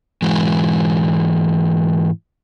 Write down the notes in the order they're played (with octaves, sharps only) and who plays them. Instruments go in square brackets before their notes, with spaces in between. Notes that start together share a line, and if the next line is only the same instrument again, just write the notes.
[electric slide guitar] G#2 E3 G#3